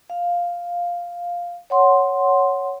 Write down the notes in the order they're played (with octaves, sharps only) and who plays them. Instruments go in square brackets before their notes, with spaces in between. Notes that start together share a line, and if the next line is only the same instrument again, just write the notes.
[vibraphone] F5
C#5 F#5 C6